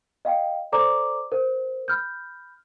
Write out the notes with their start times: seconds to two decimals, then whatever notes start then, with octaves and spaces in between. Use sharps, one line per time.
0.25 D#5 F5 G5
0.72 A4 C5 D5 A#5 D6
1.32 A#4 C5
1.88 B5 F6 G6